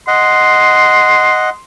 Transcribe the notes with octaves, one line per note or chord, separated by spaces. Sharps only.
D#5 F#5 C6